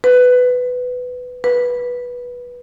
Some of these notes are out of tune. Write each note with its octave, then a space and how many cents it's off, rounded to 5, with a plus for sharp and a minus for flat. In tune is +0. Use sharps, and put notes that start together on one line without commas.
B4 +15
B4 -15